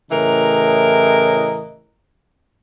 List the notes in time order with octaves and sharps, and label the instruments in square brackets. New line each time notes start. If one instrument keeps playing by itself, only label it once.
[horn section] A2 C#3 E3 A#4 D#5 A#5